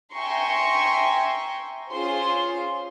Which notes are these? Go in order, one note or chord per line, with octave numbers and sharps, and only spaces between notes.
E5 G5 G#5 A#5 C6 C#6
C#4 F4 G#4 C5 C6